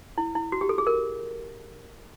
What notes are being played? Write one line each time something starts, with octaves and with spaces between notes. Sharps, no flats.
E4
E4
F#4
G4
A4
G#4
A#4